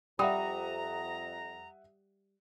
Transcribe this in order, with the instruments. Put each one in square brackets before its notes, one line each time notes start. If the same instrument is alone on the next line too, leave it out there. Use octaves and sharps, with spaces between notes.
[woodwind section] F2 A#5 [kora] G3 [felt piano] E5 F#5 D#6